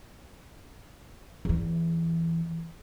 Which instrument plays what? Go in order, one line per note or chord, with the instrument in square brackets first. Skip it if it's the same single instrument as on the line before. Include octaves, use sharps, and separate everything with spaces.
[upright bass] E2 E3